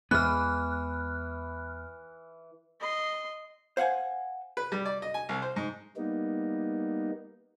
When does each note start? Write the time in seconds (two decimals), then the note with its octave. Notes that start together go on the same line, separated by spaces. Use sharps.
0.11 E2 E3 G#3 B3 F6 F#6
2.80 D#5 C6
3.77 C5 F5 F#5 G#5
4.57 B4
4.72 G3
4.85 D5
5.02 D#5
5.14 G#5
5.29 C2
5.42 C5
5.56 G#2
5.97 G3 A#3 B3 D#4